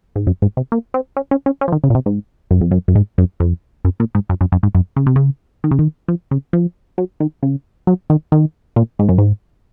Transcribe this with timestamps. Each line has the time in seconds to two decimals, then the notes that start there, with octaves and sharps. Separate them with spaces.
0.16 G#2
0.27 F#2
0.42 G#2
0.57 C3
0.72 A#3
0.94 C4
1.17 C#4
1.31 C#4
1.46 C#4
1.61 C#4
1.68 F3
1.72 D#3
1.84 C#3
1.90 A#2
1.95 C3
2.06 G#2
2.51 F#2
2.61 F2
2.71 F#2
2.88 F#2
2.95 G#2
3.18 F#2
3.40 F2
3.85 F#2
4.00 A#2
4.15 G#2
4.29 F#2
4.41 F#2
4.52 F#2
4.63 G#2
4.75 F#2
4.96 C#3
5.06 C3
5.16 C#3
5.64 D#3
5.71 C#3
5.79 D#3
6.08 F3
6.31 C#3
6.53 F3
6.98 F#3
7.20 D#3
7.43 C#3
7.87 F#3
8.10 D#3
8.32 D#3
8.76 A#2
8.99 G#2
9.09 F#2
9.18 G#2